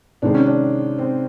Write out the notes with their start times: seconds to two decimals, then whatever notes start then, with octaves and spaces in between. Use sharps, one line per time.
0.22 C3 D#3 G#3 D4
0.34 C#4
0.46 D4
0.98 C4